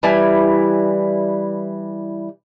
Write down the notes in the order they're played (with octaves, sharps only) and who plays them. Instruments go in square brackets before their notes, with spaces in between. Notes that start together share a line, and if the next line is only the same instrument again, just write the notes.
[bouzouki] E3 G3 E4 G#5